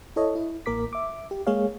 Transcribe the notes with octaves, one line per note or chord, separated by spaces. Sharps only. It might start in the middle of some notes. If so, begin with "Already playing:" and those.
E4 A4 C#5 D#5
E4
A1 A#3 A#4 D6 B6
E5 D6
G4
G#3 A#3 G#4 C#5 F5